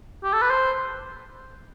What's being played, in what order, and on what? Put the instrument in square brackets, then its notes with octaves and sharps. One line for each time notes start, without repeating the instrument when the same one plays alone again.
[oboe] G4
A4
B4
C5